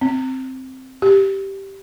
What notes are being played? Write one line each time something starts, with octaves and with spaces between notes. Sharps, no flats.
C4
G4